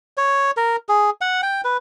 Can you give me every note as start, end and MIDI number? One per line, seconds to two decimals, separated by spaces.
0.17 0.51 73
0.57 0.76 70
0.89 1.10 68
1.21 1.41 78
1.43 1.61 79
1.64 1.77 71